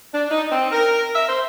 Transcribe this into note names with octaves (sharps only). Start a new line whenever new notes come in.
D4
D#4
C4
A#4
E5
C5